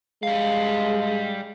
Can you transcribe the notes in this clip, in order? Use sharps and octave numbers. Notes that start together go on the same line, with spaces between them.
G3 G#3 F5